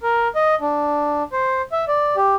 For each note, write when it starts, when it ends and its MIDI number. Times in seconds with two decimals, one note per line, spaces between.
0.03 0.28 70
0.35 0.55 75
0.61 1.23 62
1.32 1.62 72
1.72 1.85 76
1.88 2.16 74
2.16 2.36 67